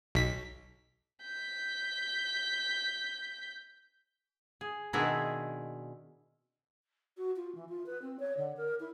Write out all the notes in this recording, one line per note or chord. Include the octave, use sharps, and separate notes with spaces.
B1 B6
G6 B6
G#4
B2 D#3 C4 D4 E4 G#4
F#4
F4
E3
F4
B4
C4
C#5
D3
A#4
E4